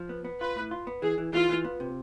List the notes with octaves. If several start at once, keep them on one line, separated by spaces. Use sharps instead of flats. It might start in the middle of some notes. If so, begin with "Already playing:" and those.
Already playing: F3
B3
B3
F4 B4
A2
F4
B3
E3 G#4
E3
E3 F4
E3
B3
C3